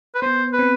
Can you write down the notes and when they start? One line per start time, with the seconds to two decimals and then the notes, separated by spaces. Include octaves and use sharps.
0.15 B4
0.22 B3 C5
0.53 B4
0.59 C4